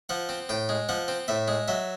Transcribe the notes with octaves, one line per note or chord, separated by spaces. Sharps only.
F3 F#5
C4
A2 G5
G#3
F3 F#5
C4
A2 E5
G#3
F#3 E5